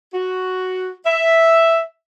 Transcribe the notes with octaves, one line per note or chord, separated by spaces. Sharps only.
F#4
E5